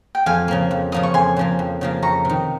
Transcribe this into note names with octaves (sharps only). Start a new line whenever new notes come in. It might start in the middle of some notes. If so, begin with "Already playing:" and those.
G5
F2 F5 G#5
C#3 F3 A#3
F2
C#3 F3 A#3 D#6
C#6
F2 G#5 C6
C#3 F3 A#3
F2
C#3 F3 A#3
F2 A#5 C#6
C3 D#3